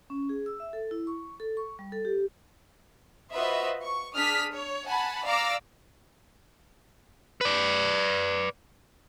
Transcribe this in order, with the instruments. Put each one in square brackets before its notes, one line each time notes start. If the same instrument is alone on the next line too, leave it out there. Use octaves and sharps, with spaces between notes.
[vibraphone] C#4
G#4
E6
E5
A4
E4
C#6
A4
C#6
G3
A4
G4
[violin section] F4 F#4 B4 C5 D#5 E5
C#6
D4 G#4 D#6 F6 B6
C#5
F#5 G#5 A5 B5
D5 F5 A#5 D6 E6 A#6
[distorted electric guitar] B4 D5